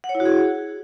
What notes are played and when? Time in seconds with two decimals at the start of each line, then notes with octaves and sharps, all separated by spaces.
0.04 F#5
0.09 C#5
0.15 E4
0.20 F#4
0.25 G#4